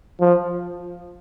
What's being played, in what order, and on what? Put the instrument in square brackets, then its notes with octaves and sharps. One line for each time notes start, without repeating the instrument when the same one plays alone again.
[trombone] F3